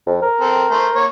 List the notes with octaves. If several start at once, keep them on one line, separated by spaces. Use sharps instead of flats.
F2
A#4
C4 A4
A3 C5
A#3 C#5